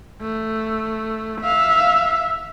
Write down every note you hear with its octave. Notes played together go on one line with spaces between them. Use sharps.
A3
E5 F5